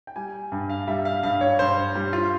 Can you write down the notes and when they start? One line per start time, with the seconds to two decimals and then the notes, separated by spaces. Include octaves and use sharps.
0.07 G5
0.16 G3 G#5
0.52 G2
0.70 F5
0.88 G3 E5
1.05 F5
1.23 G2 F5
1.41 C#5
1.59 G2 C5
1.95 G3
2.13 F4